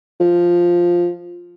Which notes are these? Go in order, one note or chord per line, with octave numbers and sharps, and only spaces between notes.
F3